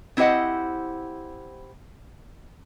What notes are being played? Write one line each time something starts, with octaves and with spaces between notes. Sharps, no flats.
C4 E4 G4 C5 D#5 F#5